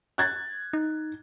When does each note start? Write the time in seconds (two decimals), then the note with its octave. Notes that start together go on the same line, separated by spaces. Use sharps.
0.18 F#6 G#6 A6
0.73 D#4